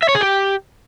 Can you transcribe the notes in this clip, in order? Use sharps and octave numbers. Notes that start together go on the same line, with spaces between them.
E5
C#5
G#4
G4